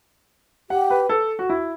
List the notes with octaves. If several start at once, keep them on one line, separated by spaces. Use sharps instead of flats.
G4 F#5
B4
A4
F#4
E4